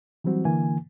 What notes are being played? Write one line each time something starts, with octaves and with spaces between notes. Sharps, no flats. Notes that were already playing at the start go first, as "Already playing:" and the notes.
E3 F#3 G3 C4 F#4
D3 E3 A#3 G#5